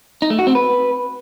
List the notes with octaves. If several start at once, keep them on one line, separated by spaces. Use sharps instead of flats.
D#4
A3
F#4
C4
B4